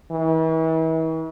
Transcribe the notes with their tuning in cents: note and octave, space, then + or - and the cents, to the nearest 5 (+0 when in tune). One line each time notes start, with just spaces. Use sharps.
E3 -40